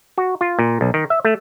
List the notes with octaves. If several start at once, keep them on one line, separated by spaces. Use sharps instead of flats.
F#4
F4
A#2
B1
D#3
E5
A3